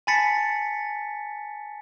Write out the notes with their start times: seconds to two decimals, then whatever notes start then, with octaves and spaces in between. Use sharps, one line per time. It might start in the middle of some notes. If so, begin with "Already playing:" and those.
0.07 G#5 A5 B5 A6 B6 C#7